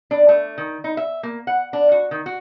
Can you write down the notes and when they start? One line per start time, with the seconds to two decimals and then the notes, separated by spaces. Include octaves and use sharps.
0.11 D4
0.29 A3
0.58 D#3
0.84 D#4
0.97 E5
1.23 A#3
1.47 F#5
1.73 D4
1.92 F#4
2.11 D#3
2.26 F#4